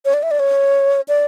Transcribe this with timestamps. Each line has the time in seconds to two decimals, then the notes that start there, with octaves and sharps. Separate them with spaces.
0.05 C#5
0.14 D5
0.23 E5
0.31 D5
0.39 C#5
1.08 D5